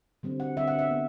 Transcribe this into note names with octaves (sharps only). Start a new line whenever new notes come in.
D3 G3 C4
F#5
D3 G3 C4 E5
F#5
E5
B3